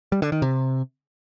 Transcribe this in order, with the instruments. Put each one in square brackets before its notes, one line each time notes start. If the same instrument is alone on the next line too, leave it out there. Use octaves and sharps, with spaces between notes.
[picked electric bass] G3
D3
D#3
C3